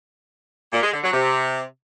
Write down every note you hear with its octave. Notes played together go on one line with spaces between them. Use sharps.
A#2
G#3
D3
F#3
C3